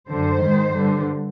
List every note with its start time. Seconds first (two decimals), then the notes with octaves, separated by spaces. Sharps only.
0.10 F#2 D3 C5
0.43 G#2 D#3
0.76 G2 D3